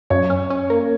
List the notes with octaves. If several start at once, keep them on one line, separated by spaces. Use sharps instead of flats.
F#2 C#5
C#4
C#4
A#3